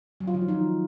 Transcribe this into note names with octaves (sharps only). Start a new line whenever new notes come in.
F#3
F4
D#3
F3
D#4